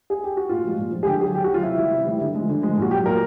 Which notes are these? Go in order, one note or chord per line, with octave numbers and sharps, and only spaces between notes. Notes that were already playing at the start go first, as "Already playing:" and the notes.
G#4
G4
F#4
A#2 F4
F3 G#3
A#2
F3 G#3
G#4
D3 G4
F#3 G#4
D3 G4
F#4
F#3 F4
C3 E4
E3 G3
C3
E3 G3
D3
F3 G#3
D3
F3 G#3
A#2 F#4
F#3 G4
A#2 A#4